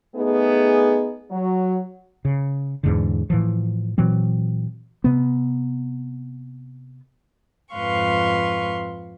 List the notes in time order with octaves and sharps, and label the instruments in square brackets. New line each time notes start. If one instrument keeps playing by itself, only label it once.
[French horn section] A3 B3 D#4 G#4
F#3
[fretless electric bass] C#3
E2 G#2 D3
A2 E3 F3
A#2 E3 F#3 C4
C3 B3
[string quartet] F2 G#2 B4 F5 C6 C#6